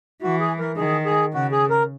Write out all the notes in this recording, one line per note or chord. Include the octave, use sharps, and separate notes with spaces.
E3 F#4
G#4
A#4
D#3 G#4
G#4
C#3 F#4
G#4
A#4